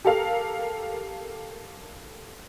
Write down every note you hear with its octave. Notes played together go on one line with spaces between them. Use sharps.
G4 A4 A#4 F5